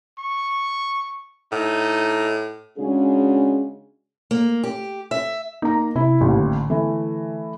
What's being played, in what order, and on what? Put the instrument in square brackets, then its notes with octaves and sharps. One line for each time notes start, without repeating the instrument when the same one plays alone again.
[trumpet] C#6
[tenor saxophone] A2 [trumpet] D#4
[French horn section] C#3 G#3 D4 F#4 G#4
[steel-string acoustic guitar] A#3
G4
E5
[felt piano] A#3 A#5 [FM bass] D#4
[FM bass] C3 [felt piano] E4
[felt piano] A1 D#2
[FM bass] D3
[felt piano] E3 A3